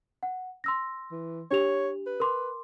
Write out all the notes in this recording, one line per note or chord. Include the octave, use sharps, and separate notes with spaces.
F#5
C6 E6 A#6
E3
D4 G4 C#5 F7
B4
A#4 C6 D6